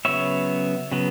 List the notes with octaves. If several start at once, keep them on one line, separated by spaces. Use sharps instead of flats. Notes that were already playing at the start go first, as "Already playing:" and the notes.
C#3 F#3 B3 C#5 E5
C#3 F#3 B3